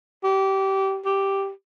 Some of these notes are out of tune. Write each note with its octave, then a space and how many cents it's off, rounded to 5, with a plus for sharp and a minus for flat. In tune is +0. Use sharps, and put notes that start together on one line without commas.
G4 -20
G4 +0